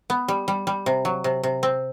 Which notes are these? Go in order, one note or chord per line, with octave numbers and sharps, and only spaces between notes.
B3
G3
G3
G3
C3
F#3
C3
C3
C4